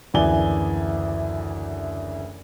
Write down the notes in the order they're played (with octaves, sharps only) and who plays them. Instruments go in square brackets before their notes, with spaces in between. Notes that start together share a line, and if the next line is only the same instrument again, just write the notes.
[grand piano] F#1 D2 E3 D5 G#5 G7